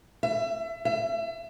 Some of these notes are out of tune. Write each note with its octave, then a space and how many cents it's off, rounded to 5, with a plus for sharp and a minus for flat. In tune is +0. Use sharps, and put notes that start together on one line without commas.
E5 +30
E5 +35